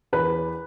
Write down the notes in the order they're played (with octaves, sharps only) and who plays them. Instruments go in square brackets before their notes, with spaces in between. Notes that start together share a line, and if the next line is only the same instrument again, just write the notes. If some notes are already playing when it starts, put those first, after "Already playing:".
[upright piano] E2 B4